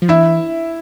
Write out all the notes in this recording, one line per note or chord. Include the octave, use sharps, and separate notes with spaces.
F3
E3 E4 E5